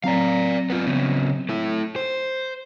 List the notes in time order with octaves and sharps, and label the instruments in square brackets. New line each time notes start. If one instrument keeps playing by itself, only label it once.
[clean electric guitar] F#3 C4 A#5 [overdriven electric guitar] D5 F5
[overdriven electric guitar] B3 F4
C#3 B3
A3 E4
C5